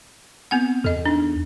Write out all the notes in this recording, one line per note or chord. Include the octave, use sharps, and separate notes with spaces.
B3 C4 F#5
E2 A4 D#5
D4 D#4